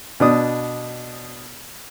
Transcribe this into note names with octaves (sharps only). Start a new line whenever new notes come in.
B2 D4 D#6